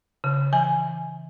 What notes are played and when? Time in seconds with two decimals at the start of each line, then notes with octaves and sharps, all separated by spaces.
0.24 C#3
0.53 E3 G#5